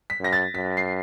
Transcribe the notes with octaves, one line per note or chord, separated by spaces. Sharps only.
B6
F#2 A#6
A6
F#2 B6
C7